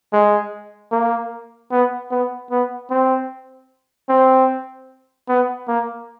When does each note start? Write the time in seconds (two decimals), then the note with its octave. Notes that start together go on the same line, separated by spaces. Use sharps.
0.13 G#3
0.92 A#3
1.71 B3
2.11 B3
2.51 B3
2.91 C4
4.09 C4
5.28 B3
5.68 A#3